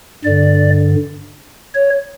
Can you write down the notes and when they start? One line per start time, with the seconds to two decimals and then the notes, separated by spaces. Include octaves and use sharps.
0.24 G2 D3 D5
1.75 C#5